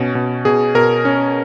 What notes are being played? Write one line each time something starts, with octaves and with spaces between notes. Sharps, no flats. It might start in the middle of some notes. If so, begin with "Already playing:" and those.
Already playing: B2 C#4
B2
B2 G#4
B2 A#4
C#4